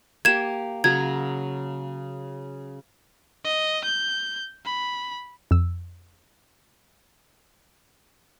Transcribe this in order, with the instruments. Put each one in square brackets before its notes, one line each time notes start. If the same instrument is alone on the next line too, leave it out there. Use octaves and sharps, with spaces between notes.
[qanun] A#3 G4 [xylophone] G#6 E7
[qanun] C#3 F#3 A#5 [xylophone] G#6
[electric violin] D#5
G6
B5
[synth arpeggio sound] F2 E6